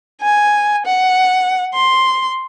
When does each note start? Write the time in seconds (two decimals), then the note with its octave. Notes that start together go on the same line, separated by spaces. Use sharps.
0.21 G#5
0.86 F#5
1.74 C6